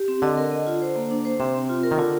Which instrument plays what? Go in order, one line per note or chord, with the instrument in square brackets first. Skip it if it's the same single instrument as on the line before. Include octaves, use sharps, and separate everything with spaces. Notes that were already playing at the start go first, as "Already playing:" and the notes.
Already playing: [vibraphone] G4
C4
[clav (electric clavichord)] D3 [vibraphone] D#5
[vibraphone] A#4
D#5
F4
C5
A#3
D4
C5
[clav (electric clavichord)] C3 [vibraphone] C4
[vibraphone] C4
F4
A#4
[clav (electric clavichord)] D#3
[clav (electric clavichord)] D3 [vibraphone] F4